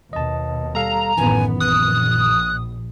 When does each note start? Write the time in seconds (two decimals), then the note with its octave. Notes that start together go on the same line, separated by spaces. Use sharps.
0.13 D#2 B2 D#5 A5
0.75 G3 A4 F5 A#5
1.17 A1 F#2 D#3 E3 B3 G#5
1.60 A#1 D#6 F#6